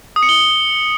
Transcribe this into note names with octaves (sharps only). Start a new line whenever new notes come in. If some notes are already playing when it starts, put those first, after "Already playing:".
D#6
C#7
G7